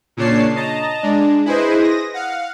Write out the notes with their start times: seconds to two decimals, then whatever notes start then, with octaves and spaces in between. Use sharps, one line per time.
0.17 A#2 C#3 D4 C#5 A5 C7
0.56 D#5 A5 A#5
1.03 G#3 D4
1.45 E4 G#4 B4 C5 D#5
1.79 D#6 A#6
2.14 F5 F#5